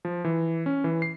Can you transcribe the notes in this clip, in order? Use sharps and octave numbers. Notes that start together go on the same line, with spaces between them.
F3
E3
C#4
E3
C7